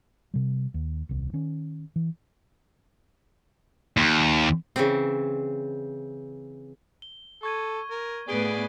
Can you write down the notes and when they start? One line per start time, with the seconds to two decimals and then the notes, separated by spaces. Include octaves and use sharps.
0.34 C3 G3
0.74 D#2
1.09 D#1 C2
1.33 D#3 C#4
1.96 E3
3.97 D#2
4.76 C#3 E3 C4
7.02 G7
7.43 A4 C#6 G#6 D#7
7.91 A#4
8.29 A2 B3 G#4 D5 B6 D7 G7